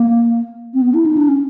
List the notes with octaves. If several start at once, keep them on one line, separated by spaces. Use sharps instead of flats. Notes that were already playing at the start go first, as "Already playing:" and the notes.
Already playing: A#3
C4
B3
E4
D#4
D4
C#4